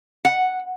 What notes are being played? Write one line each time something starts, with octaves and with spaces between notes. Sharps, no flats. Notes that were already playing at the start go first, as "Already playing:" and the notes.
F#5